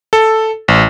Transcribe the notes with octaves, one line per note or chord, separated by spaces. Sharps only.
A4
A1